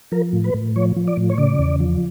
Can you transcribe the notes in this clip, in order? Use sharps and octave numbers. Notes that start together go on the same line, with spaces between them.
F3 A#4
A2
B4
A2
F3 C#5
F3
D5
A2
C#5
C#3 D5
E2
F3